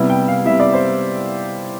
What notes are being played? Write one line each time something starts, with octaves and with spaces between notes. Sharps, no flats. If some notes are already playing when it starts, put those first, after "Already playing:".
Already playing: C3 G3 B3 E4
G5
F5
C3 G3 B3 E4 E5
D5
C5